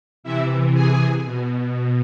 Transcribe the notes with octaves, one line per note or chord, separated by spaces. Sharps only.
C3 E3 E4 E5
G#4 G#5
B2